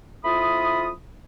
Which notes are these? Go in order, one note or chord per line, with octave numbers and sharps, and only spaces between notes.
F2 E4 F4 B5 D#6